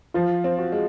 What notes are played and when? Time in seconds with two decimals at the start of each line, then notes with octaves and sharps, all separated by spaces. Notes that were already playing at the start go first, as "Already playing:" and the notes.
0.14 F3 F4
0.44 C4
0.59 F#4
0.72 G#3